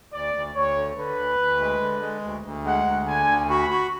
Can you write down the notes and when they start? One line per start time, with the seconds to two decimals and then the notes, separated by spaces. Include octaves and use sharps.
0.13 D2 D5
0.34 D2
0.55 D2 C#5
0.76 D3
0.96 D3 B4
1.18 D2
1.39 D2
1.60 G#3
1.81 D3
2.02 G#3
2.23 D2
2.44 D2
2.65 G#3 F#5
2.86 D2
3.07 D3 G#5
3.28 D2
3.50 F#4 B5
3.70 F#4